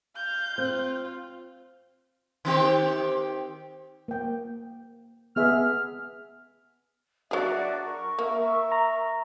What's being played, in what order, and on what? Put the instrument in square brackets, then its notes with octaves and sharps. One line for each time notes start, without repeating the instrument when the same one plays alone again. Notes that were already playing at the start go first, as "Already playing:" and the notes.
[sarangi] F5 [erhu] G6
[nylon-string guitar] C4 [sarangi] F4
[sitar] D#3 C4 G4
[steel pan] A#3 G5
[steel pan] B3 G#4 E5 [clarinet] F6
[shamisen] F#3 G#4 [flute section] D4 F#4 E5
[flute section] A#4 C#6
[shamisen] A#3 [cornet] E5
[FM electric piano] A#5